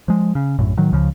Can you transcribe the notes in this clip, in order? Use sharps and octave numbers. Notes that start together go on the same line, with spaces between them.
F3 G#3
C#3
A#1 F#2 A2
A2 D#3 F#3
C#2 C#3 F3